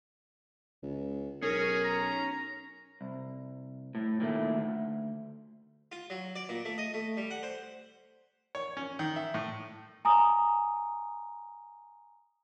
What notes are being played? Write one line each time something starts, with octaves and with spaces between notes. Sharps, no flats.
C#2
B1 C#4 G#4 A#4
A#5
C2
A2
A#2 D#3 A3
D2
F4
F#3
D5
A#2
A3
D#5
A3
G3
F#5
C5
C#5
C#4
D#3
E5
A2
G#5 A#5 D#6